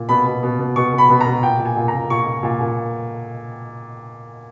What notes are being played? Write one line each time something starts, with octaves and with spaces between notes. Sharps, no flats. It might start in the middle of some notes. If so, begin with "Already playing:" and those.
Already playing: A#2
B2 B5
B2
B2
B2
B2 C#6
B2
B5
B2
A#5
B2
A#2 G5
A#2
G#5
A#2
A#5
A#2
A#2 C#6
A#2
A#2
A#2